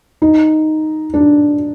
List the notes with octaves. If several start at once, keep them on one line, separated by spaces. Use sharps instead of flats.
D#4
D4